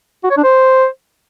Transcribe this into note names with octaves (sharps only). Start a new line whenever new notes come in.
F#4
C#5
D4
C5